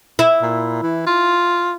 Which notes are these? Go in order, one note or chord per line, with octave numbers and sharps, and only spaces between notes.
E4
A#2
E3
F4